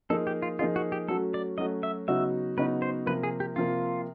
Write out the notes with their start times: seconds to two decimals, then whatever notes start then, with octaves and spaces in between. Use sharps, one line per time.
0.10 F3 A#3 D#4 G#4 A4
0.27 G4
0.42 F4
0.59 F3 A#3 D#4 F4 G#4
0.76 F#4
0.92 G4
1.08 F#3 A3 C#4 F#4 A4
1.34 D5
1.58 F#3 A3 C#4 F#4 D#5
1.83 E5
2.08 C#3 F#3 B3 D#4 F#4 E5
2.57 C#3 F#3 B3 D#4 F#4 B4
2.82 C5
3.06 C3 F3 A#3 B4
3.23 G#4
3.40 G4
3.56 C3 F3 A#3 F4